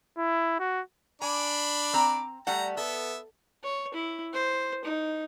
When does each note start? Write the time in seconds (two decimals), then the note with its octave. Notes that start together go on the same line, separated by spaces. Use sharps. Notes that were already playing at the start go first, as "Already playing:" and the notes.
0.18 E4
0.59 F#4
1.22 D4 G#5 B5 D6
1.93 C4 A#5
2.47 G3 A3 F#5 A#5
2.77 B3 A4 E5
3.64 C#5
3.94 E4
4.33 C5
4.85 D#4